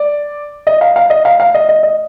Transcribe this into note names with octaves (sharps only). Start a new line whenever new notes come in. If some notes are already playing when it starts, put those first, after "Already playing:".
Already playing: D5
D#5
F5
F5
D#5
F5
F5
D#5
D#5
D#5